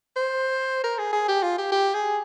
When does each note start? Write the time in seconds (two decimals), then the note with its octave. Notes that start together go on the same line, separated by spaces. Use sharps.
0.16 C5
0.84 A#4
0.98 G#4
1.13 G#4
1.28 G4
1.43 F4
1.58 G4
1.72 G4
1.94 G#4